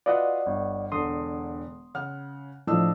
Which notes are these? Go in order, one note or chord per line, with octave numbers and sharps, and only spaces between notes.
F4 F#4 B4 D5 D#5 F#5
G1
E1 D3 C6 D#6
C#3 F#5 F6
A2 F3 D4 D#5 E6